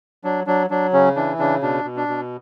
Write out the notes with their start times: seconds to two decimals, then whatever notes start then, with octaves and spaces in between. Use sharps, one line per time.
0.24 F#3 D4
0.47 F#3 D4
0.70 F#3 D4
0.93 C#3 C#4
1.16 E3 D4
1.39 C#3 D4
1.62 B2 D4
1.85 B2
1.97 D4
2.08 B2